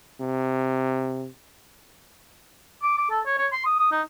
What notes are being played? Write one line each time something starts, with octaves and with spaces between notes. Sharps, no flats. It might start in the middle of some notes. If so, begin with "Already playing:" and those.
C3
D6
D6
A4
C#5
C#5
C6
D#6
D#6
D#4